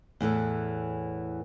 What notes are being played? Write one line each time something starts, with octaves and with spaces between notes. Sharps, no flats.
E2 A2 E3 A4